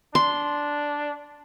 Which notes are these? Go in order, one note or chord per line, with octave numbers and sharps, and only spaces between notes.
D4 C6